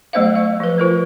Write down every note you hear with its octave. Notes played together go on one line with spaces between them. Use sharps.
F#3 A3 B3 C5 D#5 F5
A3 F5 C#6
F3 B4
F4 A#4 C5